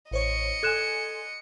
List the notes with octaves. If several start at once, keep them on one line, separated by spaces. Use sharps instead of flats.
A1 C5 C#5 D#5 C#7
A4 G#5 C6 F#6 G#6 E7